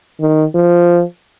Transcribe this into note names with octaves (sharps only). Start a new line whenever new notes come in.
D#3
F3